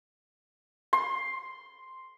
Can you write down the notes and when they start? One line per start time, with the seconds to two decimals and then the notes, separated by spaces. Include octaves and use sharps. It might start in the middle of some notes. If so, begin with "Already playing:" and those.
0.93 C6